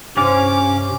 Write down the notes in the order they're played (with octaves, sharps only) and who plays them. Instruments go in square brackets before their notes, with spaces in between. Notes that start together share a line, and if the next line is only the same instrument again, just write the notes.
[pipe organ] G2 C3 [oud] C4 E4 C5 [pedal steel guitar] C#4 F5 [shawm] D6